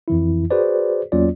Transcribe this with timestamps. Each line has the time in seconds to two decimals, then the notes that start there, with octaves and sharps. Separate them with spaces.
0.08 F2 E3 E4
0.51 F#4 G#4 B4 C5 D5
1.12 E2 F#3 A#3 C#4 F4 D5